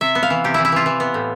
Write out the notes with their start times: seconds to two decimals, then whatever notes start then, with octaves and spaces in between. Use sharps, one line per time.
0.01 C3 E5
0.15 B3
0.23 F5
0.30 E3
0.44 C3 G4
0.54 E3 E4
0.65 E4
0.72 E3 F4
0.86 E3
1.00 B3
1.14 A2